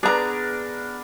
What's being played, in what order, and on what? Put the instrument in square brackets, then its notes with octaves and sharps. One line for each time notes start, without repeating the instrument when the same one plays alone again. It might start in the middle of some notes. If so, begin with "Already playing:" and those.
[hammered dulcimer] B3 [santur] D4 A#4 [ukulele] G#4 A#5